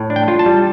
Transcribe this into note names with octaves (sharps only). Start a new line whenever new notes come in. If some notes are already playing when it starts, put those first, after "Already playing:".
Already playing: A2
D4
G5
F4
A5
G3